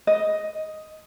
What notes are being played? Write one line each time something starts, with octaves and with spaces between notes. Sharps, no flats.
D#5